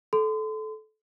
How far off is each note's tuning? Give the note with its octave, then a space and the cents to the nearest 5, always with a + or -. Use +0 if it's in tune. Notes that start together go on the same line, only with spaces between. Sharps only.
A4 -25 C6 -35